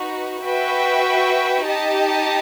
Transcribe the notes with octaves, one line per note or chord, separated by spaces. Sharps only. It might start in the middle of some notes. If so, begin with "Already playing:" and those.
Already playing: D#4 F#4 B4
F#4 B4 E5 G5
D#4 G4 D#5 A5